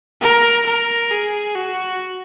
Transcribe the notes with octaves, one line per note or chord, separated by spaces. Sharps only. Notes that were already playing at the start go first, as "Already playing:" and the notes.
A#4
A#4
G#4
F#4